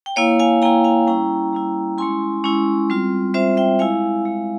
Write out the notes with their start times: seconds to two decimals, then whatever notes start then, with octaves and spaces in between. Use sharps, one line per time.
0.06 G5
0.16 A#3 E4 C#5 F5
0.40 F5 G#5
0.62 A#3 E4 G5 A#5
0.84 F5 G#5
1.07 G3 C#4 E4 G5 A#5
1.53 G3 C#4 E4
1.98 G#3 C#4 E4 G#5 C6
2.44 G#3 C#4 E4
2.90 G3 C4 F4
3.34 G3 C4 F4 C5 E5
3.57 E5 G5
3.79 G#3 E4 F5 G#5
4.25 G#3 E4